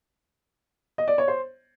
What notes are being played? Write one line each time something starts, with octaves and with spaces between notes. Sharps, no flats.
D#5
D5
C#5
C5